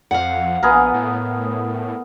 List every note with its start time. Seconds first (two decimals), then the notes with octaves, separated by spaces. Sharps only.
0.11 F2 F5 F#5
0.63 A#1 B3 G#4 A#4
0.94 A2